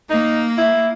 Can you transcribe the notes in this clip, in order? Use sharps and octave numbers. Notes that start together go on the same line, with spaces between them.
A#3 D#4
E4